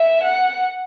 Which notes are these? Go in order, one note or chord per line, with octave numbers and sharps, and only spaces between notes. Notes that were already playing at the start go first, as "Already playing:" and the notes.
Already playing: E5
F#5